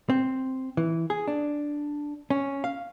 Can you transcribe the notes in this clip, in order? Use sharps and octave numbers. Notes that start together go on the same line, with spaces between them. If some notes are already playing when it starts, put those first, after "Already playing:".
C4
E3
G#4
D4
C#4
F5